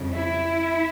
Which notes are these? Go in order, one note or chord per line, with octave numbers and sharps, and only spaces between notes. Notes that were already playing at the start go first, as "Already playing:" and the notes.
Already playing: F2 C#3 G3
E4